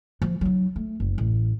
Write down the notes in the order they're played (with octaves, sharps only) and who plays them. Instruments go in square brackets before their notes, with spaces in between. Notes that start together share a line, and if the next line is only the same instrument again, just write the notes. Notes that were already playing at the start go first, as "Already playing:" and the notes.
[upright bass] F3
F#3 D#4
A3
F#1
A1